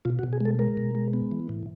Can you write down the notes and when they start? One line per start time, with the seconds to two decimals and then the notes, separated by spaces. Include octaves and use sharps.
0.05 B2 F4
0.19 F#4
0.23 B2
0.33 G#4
0.41 G#3 A4
0.59 G#3 A#4
0.77 B2
0.95 G#3
1.13 B3
1.32 E3
1.49 A2